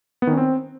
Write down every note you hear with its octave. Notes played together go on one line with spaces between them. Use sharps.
B3
D#3
C#4
C4